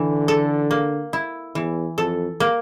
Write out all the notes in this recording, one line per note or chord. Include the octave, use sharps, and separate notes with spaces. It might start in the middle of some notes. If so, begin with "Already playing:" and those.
Already playing: D3 E3
A4
A#3
E4
E2 E3
F2 A4
A#3